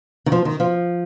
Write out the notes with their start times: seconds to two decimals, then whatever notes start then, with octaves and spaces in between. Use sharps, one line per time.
0.26 D#3
0.32 F3
0.45 D#3
0.60 F3